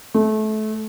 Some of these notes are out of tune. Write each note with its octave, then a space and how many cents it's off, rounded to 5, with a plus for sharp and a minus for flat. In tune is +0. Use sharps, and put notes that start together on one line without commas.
A3 -25